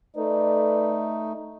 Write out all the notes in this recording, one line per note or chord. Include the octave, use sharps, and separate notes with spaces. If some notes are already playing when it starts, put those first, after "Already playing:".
A3 D#4 A4 B4 D5